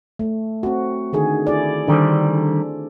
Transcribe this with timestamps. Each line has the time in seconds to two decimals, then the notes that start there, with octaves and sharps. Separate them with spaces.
0.19 A3
0.63 C4 F#4
1.13 D3 D#3 G#4
1.47 E4 G#4 D5
1.88 D3 D#3 G3 D4 A4 C5